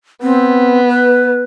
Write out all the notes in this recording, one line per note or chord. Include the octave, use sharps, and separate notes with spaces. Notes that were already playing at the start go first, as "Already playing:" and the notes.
B3 C4
B4